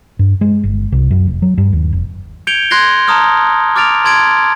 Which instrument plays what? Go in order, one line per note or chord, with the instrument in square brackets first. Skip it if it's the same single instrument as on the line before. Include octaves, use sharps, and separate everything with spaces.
[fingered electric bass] G2
G#3
G1
C2
F#2
F1
F#3
G2
D#2
F1
[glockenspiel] G6 G#6 C#7 D7 F7 G7
C6 F#6 G#6 A#6 C7 G7
A5 A#5 D#6 F6
D6 F6 A6 D7 F7
A5 C6 G#6 A6 D7